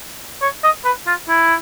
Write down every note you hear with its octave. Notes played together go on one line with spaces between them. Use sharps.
C#5
D#5
B4
F4
E4